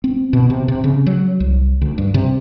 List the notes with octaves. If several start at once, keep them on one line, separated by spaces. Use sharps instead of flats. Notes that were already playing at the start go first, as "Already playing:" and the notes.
C4
B2
C3
C3
C#3
F#3
C2
D2
G2
C3